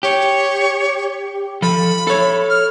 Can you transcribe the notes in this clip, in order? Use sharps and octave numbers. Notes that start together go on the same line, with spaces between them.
G4 C#5
F3 A4 B5
A4 C#5
F6